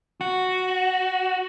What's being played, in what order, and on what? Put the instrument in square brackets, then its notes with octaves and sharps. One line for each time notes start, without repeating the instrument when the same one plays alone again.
[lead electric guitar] F#4